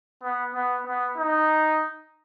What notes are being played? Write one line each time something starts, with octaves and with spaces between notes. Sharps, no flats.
B3
B3
B3
D#4